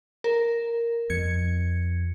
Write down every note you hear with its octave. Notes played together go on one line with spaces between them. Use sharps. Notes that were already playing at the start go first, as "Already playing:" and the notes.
A#4
F2 G#6 C#7